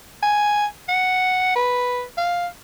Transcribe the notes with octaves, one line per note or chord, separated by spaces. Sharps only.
G#5
F#5
B4
F5